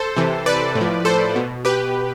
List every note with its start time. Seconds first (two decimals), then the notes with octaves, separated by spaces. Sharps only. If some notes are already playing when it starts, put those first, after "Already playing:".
Already playing: A4 C5
0.16 C3 E3
0.46 B4 D5
0.75 A2
0.81 F3
1.05 A4 C5
1.36 B2
1.65 G4 B4